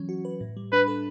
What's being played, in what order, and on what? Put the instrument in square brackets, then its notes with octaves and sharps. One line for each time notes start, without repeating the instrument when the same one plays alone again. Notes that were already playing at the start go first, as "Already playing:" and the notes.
Already playing: [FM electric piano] E3 F#3 C#4
F#4
B4
A2
G3
[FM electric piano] D4 [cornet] B4
[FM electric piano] A4